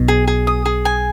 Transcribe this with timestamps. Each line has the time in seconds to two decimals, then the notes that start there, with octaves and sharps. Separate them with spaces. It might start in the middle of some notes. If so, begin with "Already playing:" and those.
Already playing: B1 B2
0.08 G#4
0.28 G#4
0.47 D#6
0.65 G#4
0.85 G#5